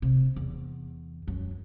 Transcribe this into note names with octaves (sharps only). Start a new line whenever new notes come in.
C3
E2
F#2